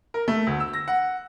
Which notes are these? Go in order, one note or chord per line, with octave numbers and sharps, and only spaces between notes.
A#4
A3
D2
E6
A#6
F#5